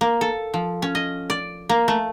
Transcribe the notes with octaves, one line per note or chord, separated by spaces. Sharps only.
A#3
A4
F3
C#4
D#5
D5
A#3
A3